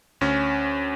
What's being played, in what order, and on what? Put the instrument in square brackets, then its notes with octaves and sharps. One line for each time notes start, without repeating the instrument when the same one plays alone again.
[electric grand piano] D2 C#4